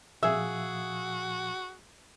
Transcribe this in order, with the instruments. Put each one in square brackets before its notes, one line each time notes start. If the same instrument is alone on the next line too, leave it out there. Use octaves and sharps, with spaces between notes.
[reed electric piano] A#2 F3 F5 [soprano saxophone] F#4 [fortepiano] G#4 E6 [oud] E5